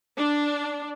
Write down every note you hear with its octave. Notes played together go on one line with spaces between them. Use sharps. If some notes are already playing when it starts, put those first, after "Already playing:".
D4